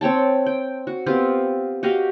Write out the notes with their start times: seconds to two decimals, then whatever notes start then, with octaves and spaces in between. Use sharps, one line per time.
0.01 C4 C#5 G5 A5
0.46 G5
0.87 F#4
1.06 B3 C4 F4 G4
1.83 F#4 G4 D#5 F5